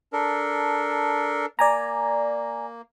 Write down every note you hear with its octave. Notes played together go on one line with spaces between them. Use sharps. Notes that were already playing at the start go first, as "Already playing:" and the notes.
D4 A4 A#4
A#3 D5 G#5 A#5